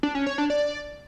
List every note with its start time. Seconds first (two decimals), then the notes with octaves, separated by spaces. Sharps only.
0.03 D4
0.15 C#4
0.26 C#5
0.38 D4
0.50 D5